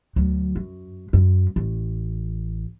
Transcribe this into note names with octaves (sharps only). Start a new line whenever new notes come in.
D2 F#3
F#2
F#2
A1